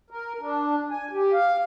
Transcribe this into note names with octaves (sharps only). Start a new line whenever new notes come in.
A#4
D4
G#5
G4
F5